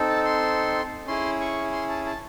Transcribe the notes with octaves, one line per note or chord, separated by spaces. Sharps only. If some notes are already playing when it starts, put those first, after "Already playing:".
Already playing: C4 D#4 A4
A5
C6
C#4 E4 G#4 C6
C#6
C6
A5
A5